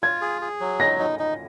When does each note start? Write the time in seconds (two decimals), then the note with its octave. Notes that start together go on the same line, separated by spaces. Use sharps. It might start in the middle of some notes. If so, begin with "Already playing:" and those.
0.03 F4 G#6
0.21 G#4
0.41 G#4
0.60 F#3
0.80 D#4 A#6
0.99 D#4
1.19 D#4